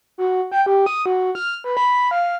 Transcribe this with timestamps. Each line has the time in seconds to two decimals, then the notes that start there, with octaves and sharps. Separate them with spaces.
0.18 F#4
0.52 G5
0.66 G4
0.86 D#6
1.06 F#4
1.35 F6
1.64 B4
1.77 B5
2.11 F5